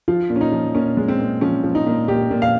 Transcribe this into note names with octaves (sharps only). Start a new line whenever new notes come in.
F3 F4
A#2
C#4
D#4
F3
A#2 C#4
G#3
C4
A#2
F3 C#4
F3
D#4
A#2
A#2 G4
A#2
F5